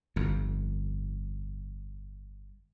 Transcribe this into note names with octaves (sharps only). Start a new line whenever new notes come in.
G1 F2